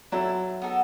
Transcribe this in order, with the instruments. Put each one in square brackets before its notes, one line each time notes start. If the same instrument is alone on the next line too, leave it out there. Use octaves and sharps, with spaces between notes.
[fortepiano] F#3 [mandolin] C4 E4 A4
[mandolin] B3 D#4 A4